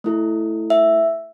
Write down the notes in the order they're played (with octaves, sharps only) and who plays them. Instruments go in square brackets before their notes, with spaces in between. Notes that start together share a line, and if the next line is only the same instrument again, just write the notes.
[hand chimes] A3 E4 A4
E5